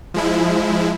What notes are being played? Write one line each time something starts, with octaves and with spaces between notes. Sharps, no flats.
F3 G#3 E4